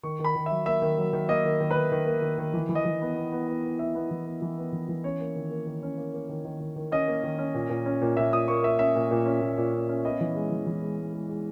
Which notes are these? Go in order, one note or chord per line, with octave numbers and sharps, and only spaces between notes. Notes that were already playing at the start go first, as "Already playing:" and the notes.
D#3 C#6
D#3
B5
D#3
F#3 E5
A#3 E5
D#3
F#3
D#3
A#3 D#5
D#3
D#3
D#3 B4
D#3
A#3
D#3
D#3
E3
E3
D#5
E3
B3
B3
B3
B3
B3
B3 E5
B3
E3
B3
E3
B3
E3
E3
C#4 C#5
A#3
D#3
A#3
D#3
C#4
A#3
A#3
D#3
D#3
D#3
D#3
C#4 D#5
A#3
D#3
C#4
A#2
A#2
C#4
A#2
A#2 E5
A#2 D#6
A#3 C#6
A#3 E5
C#4 E5
A#2
A#2
C#4
A#2
A#2
C#4
C#4
B3 D#5
E3
G#3
E3
E3
G#3
G#3
G#3
G#3